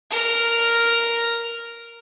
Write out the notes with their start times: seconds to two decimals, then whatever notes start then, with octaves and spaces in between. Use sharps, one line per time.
0.10 A#4 F6